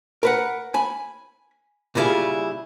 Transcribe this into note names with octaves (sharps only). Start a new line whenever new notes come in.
A#4 B4 F#5
G#5 B5
A#2 C#3 G3 E4 F4 G#4